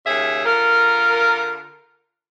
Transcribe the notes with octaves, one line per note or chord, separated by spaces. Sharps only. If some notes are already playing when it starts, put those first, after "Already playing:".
D#2 C#3 G#4 E5
D3 F4 A#4